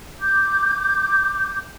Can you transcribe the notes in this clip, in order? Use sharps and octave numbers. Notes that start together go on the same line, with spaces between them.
D6 G6